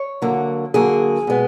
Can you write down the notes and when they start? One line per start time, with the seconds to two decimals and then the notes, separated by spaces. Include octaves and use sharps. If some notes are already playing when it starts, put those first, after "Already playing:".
Already playing: C#5
0.22 D3 F#3 A#3
0.74 D3 F#3 A#3 G#4
1.27 B2 G#3 B3